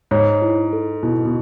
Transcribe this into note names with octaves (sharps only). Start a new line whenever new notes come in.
G#2 C#5
E4
A4
B2 E4
B2